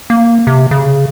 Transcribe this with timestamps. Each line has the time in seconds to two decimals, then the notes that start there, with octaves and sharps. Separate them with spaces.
0.10 A#3
0.47 C3
0.71 C#3